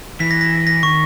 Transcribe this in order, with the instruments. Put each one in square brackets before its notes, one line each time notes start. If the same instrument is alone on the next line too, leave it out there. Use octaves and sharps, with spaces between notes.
[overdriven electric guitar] E3 [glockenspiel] B6
[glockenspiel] A#6
A#6
A#6
[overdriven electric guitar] D#3 [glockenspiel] C#6